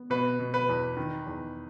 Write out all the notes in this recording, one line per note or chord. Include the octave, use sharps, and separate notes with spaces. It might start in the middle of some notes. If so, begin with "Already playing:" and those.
Already playing: B3
B2 B4
B2
B4
E2
D#3
E2